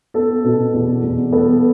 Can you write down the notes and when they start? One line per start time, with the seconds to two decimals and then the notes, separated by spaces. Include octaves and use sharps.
0.14 B3 A4
0.44 B2
0.74 E2
1.03 E2
1.32 B3 A4